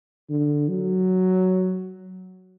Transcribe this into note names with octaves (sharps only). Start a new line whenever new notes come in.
D3
F#3